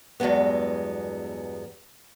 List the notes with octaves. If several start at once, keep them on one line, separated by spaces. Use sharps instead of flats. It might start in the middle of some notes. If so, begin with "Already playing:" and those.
E2 G2 F#3 G#3 B3